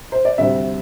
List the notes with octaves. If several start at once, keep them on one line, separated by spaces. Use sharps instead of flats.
C5
D5
D2 C3 G3 C4 E5